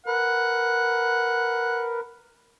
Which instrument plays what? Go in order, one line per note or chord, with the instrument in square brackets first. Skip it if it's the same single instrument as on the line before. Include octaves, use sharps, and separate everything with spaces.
[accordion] A#4 B4 [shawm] F#5